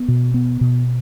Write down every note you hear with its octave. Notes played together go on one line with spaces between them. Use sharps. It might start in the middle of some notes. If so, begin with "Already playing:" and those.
Already playing: B3
B2
B3
B2